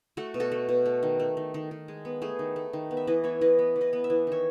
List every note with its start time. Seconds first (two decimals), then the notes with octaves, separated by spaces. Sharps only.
0.17 A3 F#4 A4
0.34 B2
0.40 F#4 A4
0.52 A3
0.69 B2
0.86 A3
1.03 D#3
1.20 A3
1.37 D#3
1.54 D#3
1.71 D#3
1.88 G#3
2.05 B3
2.22 A3 G#4 B4
2.39 D#3
2.56 A3
2.73 D#3
2.91 B3
2.97 E5
3.07 E3 B4 D#5
3.24 B3 C#5 E5
3.41 E3 B4 D#5
3.59 B3
3.76 E3
3.81 B4 D#5
3.93 B3
4.04 E5
4.10 E3
4.27 D#3 C#5 E5